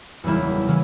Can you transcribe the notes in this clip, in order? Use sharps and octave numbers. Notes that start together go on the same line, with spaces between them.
F#1 E2 C#3 E3 G3 E4
C#3 E3